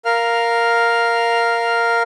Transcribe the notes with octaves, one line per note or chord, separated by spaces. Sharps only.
A#4 F5 F6